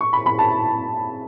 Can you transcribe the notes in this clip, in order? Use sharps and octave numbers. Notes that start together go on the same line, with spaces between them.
C#6
B5
B5
A5